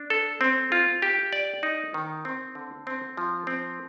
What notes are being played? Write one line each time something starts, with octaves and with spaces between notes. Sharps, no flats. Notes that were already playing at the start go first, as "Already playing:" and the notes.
Already playing: D4
A4
C4
F4
G4
D5
D#4
D#3
C4
D3
C4
F3
C4